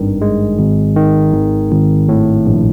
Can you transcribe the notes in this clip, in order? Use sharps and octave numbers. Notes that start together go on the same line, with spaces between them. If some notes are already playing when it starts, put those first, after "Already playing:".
Already playing: G#1 G2 D#3
G#3
G#1
D#3
G#1
G#1
A2
A#1